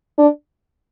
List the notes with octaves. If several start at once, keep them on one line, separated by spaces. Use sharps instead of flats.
D4